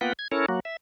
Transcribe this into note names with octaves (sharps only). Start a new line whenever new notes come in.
A#3 B3 F4 B4 F#5 G5
G#6
C#4 E4 A4 A#4 C#5
F#3 A#3 F#4
E5